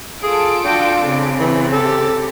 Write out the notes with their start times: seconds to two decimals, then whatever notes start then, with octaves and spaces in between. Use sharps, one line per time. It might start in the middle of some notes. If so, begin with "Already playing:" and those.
0.23 F4 G#4 A4 D7
0.64 D4 F#4 G5
1.01 C#3 C4
1.39 E3
1.73 G4 A4